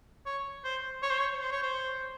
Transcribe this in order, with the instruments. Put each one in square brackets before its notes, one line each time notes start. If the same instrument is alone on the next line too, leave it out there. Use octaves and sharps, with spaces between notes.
[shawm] C#5
C5
C#5
C5
C#5
C5
C#5
C5